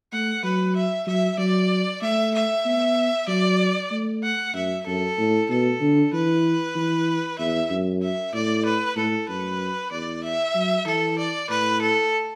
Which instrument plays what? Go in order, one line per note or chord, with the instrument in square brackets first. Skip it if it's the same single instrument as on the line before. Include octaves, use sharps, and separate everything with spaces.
[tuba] A3 [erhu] F#5
[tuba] F#3 [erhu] B4
[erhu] E5
[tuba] F#3 [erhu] E5
[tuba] F#3 [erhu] D5
[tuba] A3 [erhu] E5
[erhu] E5
[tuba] B3
[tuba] F#3 [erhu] D5
[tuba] A3
[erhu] F#5
[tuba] F#2 [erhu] E5
[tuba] F#2 [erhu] A4
[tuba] A2
[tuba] B2 [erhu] A4
[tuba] D3
[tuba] E3 [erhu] B4
[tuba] E3
[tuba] E2 [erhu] E5
[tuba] F#2
[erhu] E5
[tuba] A2 [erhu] D5
[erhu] B4
[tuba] A2 [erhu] A4
[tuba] F#2 [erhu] B4
[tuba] E2 [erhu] D5
[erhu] E5
[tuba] F#3
[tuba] E3 [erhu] A4
[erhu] D5
[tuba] A2 [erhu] B4
[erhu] A4